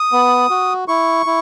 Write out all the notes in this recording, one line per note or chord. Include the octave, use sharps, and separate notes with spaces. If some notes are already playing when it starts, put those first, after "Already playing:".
Already playing: D#6
B3
F#4
E4 C#6
E4